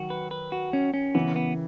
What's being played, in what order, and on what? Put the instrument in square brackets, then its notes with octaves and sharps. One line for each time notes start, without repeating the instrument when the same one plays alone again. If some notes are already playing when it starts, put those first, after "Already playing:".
Already playing: [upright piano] D#3 F#3 [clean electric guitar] F#4
[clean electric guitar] B4
B4
F#4
C#4
C#4
[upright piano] C#3 E3 [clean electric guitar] B3
[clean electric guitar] B3